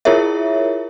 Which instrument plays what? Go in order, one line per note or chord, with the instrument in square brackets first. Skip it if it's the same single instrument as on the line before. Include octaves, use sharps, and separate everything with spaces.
[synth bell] E4 F4 G#4 A#4 C#5 E5